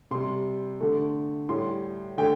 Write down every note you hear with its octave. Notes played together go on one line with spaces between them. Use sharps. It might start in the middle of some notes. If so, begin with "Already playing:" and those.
C3 G3 C6
D3 A3
A2 G3 C6
D3 A3 G5